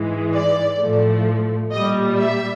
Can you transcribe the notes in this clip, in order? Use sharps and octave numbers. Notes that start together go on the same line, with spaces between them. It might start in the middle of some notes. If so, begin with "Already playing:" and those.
Already playing: G#2 E3 G#3
D5
A2 F3 A3
A#2 G3 D#5
E5